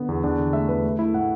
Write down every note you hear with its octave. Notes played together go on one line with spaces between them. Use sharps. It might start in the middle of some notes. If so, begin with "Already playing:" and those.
Already playing: D3 B3
E2
E2 D4
D3
A3 E5
E2 B4
A3
A3 E4
A2 F#5